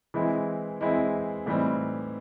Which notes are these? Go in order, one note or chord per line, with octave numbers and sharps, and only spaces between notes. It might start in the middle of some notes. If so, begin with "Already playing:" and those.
E3 G#3 C4 E4
E3 G#3 C4 E4
A2 E3 G3 C4 D#4